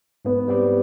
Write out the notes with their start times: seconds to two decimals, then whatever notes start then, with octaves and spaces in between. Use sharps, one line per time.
0.25 G#2 B3
0.48 G3 C4 G4